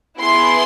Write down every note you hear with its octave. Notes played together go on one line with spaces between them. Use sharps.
B3 E4 G#4 C6